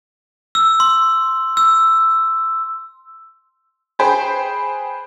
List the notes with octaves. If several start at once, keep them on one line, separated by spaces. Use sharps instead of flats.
E6
C6
E6
G#4 B4 C5 G5